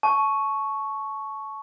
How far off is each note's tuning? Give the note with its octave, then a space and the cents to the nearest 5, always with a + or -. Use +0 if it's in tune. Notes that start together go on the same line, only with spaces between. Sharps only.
A5 -20 C#6 +0